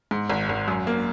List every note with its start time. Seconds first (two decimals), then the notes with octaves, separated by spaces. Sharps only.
0.11 G#2
0.29 G#1
0.49 G#1
0.68 F#2
0.87 A#3